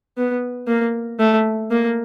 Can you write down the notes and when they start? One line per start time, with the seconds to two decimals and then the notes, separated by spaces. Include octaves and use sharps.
0.18 B3
0.68 A#3
1.20 A3
1.71 A#3